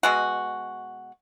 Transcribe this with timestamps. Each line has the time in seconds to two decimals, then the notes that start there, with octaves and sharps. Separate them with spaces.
0.03 B2 G#3 F#4